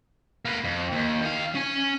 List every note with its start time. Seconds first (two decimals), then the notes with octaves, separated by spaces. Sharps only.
0.45 A#3 B4
0.64 F2
0.92 D#2
1.22 D#3 F5
1.55 C#4 G#5